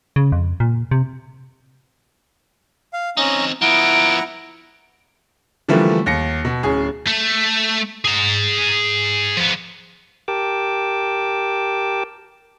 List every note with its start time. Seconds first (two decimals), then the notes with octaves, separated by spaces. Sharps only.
0.16 C#3
0.32 F2
0.60 A#2
0.91 C3
2.93 F5
3.17 C4 C#4 D#4 A#5
3.62 F3 B3 E4 F#5 A#5 D7
5.68 D3 E3 F3 G3 A3 A#3
6.06 D#2 A#6 C#7
6.45 B2
6.63 D1 C#4 G#4
7.07 A3
8.05 G#4 A#5
9.37 F3 B3
10.28 G4 A#4 G5 A5 D6